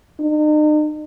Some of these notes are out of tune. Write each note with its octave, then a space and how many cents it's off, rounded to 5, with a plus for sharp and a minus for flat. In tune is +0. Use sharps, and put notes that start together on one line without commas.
D#4 -40